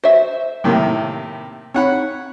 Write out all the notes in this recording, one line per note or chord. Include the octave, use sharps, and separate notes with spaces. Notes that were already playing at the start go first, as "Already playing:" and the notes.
F#4 C5 E5
A2 C3 D#3 F#3 A3 A#3
C4 D#4 C#5 F#5 B5